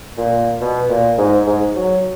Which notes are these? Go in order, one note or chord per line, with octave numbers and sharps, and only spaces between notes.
A#2
B2
A#2
G#2
G#2
F#3